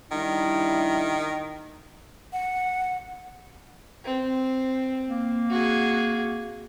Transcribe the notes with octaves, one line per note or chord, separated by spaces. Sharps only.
D#3 G3 D4 E4
F#5
C4
A#3
F#4 G#4